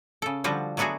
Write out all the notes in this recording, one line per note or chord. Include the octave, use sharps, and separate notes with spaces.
C#3 A4
D3 F3 G3 F4 F#4
F#3 A3 B3 D4 F#4 G#4